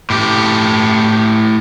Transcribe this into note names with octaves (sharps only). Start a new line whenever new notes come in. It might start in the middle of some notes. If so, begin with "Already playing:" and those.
A2 G4